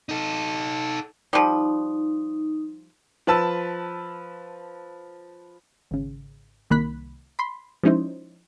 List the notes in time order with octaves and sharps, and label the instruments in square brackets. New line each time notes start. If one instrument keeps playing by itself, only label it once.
[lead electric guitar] D#4 A4
[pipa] F3 G3 [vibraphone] D#4
[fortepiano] F3 B4 A5 E6
[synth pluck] G#1 C#3
C2 D#3 A#3 B5 F#6 B6
B5 C6
F3 G#3 C#4 D#4 E4 C5